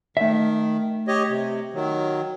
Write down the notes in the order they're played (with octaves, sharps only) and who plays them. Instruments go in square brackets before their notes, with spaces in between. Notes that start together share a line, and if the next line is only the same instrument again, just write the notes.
[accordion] D#3 [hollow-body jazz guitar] A3 E5
[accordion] G4 C#5 D#5
C3
D#3 F#3